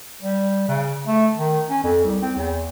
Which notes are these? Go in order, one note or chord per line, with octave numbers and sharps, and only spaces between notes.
G3
C#3
A3
D#3
C#4
F2
C2
C4
E2